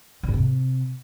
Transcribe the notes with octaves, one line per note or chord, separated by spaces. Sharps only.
D3
G#2
C3